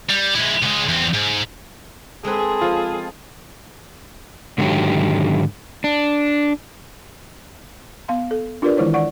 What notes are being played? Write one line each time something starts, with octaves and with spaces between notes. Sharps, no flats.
G3
G#3 E4
C#2 G#3
E2 C4
G#2
G#3 C4 G#4 A4 B4
F3 F4
G#2 D3 D#3 F#3 G4
D4
B3 F5 C6
A4
D4 F4 G4 A#4 B4 D5
D#3 E3 G#3 E4 C5 C#5
D5 F#5 C#6